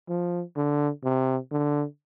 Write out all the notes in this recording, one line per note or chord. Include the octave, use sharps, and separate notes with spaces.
F3
D3
C3
D3